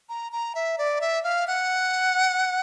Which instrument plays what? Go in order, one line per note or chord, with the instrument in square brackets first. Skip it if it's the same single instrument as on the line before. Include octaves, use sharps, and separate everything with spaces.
[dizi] A#5
A#5
E5
D5
E5
F5
F#5